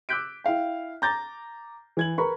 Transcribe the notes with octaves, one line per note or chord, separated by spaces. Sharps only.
D6 E6 F#6 G6 B6 D7
E4 E5 F5 G5
A#5 D6 G6 A6 A#6
E3 G#6 F#7
A#4 B4 A#5 B5 C#6